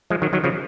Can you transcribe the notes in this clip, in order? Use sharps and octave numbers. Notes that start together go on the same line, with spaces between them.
F3 G#3
D#3 F#3
D#3 F#3
C#3 F3